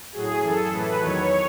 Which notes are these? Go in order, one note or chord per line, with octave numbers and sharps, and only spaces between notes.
A2 F#3 G#4
F#2 E3 A4
A2 E3 B4
E2 D#3 F#3 C#5